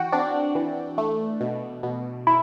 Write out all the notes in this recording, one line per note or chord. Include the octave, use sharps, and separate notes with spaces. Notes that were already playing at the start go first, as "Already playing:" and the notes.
Already playing: E3 F#4 F#5 G5
C4 D4 D5
E3
A3
B2
B2
E4